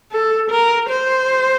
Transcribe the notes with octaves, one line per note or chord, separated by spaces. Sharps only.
A4
A#4
C5